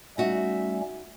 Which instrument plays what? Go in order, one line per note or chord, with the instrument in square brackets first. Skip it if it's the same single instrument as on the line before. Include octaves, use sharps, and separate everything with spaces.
[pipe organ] G3 A3 C#4 [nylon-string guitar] D#4 F#4 [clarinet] E5